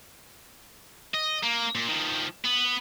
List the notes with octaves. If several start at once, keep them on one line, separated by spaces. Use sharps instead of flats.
D#5
A#3
A#2
D#3 F3
B3